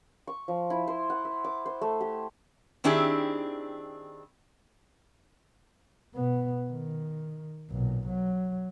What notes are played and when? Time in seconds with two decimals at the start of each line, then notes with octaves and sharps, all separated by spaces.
0.27 C#6
0.48 F3
0.70 E4
0.88 C5
1.10 F#5
1.25 E5
1.44 D6
1.66 C5
1.81 A3
2.01 G4
2.84 D#3 C4 D4 E4 G4 G#4
6.13 B2 B3
6.70 D#3
7.70 B1 A#2
8.07 F#3